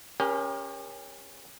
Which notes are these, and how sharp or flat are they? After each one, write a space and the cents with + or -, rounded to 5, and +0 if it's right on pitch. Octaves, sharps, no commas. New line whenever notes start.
C#4 +0 G4 +35 A#4 +30